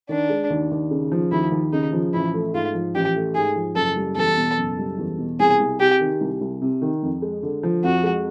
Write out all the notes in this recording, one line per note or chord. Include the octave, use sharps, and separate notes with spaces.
D#3 D4
G#3
D#2
D#2
C#3
F3
D#2 E4
D#2
C#3 D#4
F3
A1 E4
A3
G#2 F4
F3
A1 G4
A3
G#2 G#4
F3
F#1 A4
G3
E2 A4
B2
F#1
G3
E2
B2
C2 G#4
C2
C3 G4
D#3
C2
C2
C3
D#3
F2
G#3
D3
F3
F2 F#4
G#3